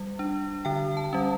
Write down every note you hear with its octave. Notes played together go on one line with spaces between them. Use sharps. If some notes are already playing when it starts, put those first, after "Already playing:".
Already playing: G3
D4
D3 G5
A5
G3 C#4